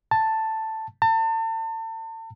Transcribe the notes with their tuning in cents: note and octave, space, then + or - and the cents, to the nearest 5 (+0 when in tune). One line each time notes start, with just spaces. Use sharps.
A5 +5
A5 +35